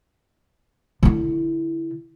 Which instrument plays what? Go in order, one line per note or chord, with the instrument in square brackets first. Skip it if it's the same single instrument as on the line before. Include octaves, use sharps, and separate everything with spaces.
[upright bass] D3 E4